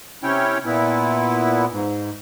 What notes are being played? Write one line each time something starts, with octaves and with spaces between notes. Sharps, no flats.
C3 C#4 E4 C#5 G5
A#2 B3 E4
G#2